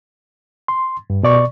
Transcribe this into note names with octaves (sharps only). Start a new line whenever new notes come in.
C6
G2
B2 D5 C#6